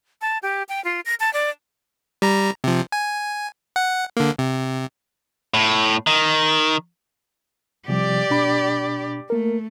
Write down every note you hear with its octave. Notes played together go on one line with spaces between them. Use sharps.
A5
G4
G5
F4
A#6
A5
D5
G3 A#5
C3 F3
G#5
F#5
D3 A#3
C3
A2
D#3
C3 F3 G3 G4 D5
B2 D4 B5
A3 A#3 A#4